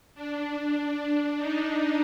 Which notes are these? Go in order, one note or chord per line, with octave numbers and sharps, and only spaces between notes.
D4
D#4